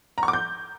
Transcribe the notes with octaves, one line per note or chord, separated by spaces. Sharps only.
A#5
C#6
D6
G6